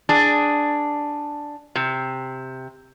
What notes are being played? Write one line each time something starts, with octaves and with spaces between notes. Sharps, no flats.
D4 G#4
C3